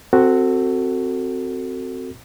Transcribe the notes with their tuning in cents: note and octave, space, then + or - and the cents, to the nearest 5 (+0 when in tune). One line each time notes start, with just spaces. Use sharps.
C4 -5 F#4 +5 A4 +25